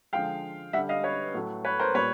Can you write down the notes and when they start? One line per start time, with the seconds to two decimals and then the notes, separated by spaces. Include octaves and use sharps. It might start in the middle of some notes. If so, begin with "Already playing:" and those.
0.13 D3 F3 G#3 F5 G5
0.73 G3 E5 F#5
0.77 D3
0.89 D#5 F5
1.03 B4 C#5
1.34 A2 F#3 A3
1.65 B4 C#5
1.80 A#4 C5
1.94 A#2 G3 B4 C#5